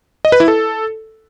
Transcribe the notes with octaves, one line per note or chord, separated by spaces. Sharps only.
D#5
B4
E4
A4